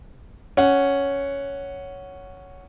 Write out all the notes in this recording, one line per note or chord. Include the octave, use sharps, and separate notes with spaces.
C#4 F#5